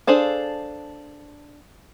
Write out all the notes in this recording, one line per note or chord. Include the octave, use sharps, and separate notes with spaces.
D4 G#4 A4 C5 F5